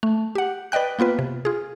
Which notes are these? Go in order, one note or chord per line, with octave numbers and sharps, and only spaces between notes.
A3
G4 F#5
B4 D5 D#5 G5 F#6
A#3 B3 F4 B4
C3
F4 G#4